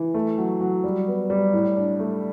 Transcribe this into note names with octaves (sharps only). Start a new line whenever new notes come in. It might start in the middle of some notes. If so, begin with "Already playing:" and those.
Already playing: E3
A3
F#3
F#3
G3
B3
G3
A2
D4
A3